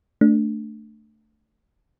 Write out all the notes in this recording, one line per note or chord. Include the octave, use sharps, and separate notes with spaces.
A3 D4